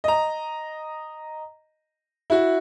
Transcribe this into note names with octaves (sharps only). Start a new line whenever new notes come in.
D#5 A#5
E4 F#4